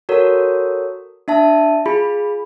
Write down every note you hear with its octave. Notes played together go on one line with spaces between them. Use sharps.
F#4 A4 A#4 C#5
D4 E5 A5
F4 G#4 B5